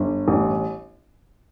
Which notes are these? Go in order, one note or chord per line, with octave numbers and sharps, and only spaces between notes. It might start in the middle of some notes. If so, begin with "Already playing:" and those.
Already playing: G1
A1